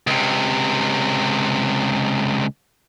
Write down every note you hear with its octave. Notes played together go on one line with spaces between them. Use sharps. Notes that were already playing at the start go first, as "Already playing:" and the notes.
C#2 C3